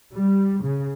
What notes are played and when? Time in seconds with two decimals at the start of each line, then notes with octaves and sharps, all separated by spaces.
0.15 G3
0.64 C#3